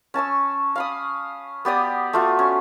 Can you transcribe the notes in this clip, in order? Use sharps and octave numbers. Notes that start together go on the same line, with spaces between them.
C#4 A5 C#6 E6
F5 B5 D#6
B3 G4 D5 D#6
A3 F4 F#4
C#4